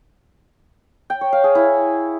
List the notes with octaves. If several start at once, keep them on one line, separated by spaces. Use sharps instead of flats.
G5
C#5
F5
G#4
E4